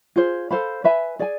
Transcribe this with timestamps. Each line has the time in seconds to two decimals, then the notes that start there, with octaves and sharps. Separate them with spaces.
0.16 F4 G#4 C5
0.51 A4 C5 F5 B5
0.84 B4 E5 G#5 B5
1.19 G#4 D5 G#5